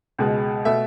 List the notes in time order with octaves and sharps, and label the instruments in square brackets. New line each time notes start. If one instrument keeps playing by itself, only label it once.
[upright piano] C#2 B2 G#3
B2 A3 E5